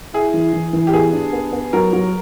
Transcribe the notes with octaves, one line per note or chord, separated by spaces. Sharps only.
E4 G#4
E3
E3
E3
G4
B3 G#4
D4
B3
B3
F#3 A#4
F#3